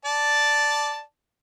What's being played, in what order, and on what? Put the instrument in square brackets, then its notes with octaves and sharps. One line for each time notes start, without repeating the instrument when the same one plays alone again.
[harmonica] D5 A5